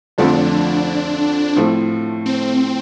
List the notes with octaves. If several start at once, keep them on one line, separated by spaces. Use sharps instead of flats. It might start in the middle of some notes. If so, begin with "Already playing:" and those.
F2 D3 F3 A3 C4 D4
A2 F3 A3 C4
C4